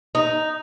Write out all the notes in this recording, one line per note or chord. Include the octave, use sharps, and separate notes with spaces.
D#4